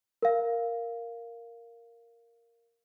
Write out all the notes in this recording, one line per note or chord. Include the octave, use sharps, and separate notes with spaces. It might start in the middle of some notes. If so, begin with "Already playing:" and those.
A#4 F5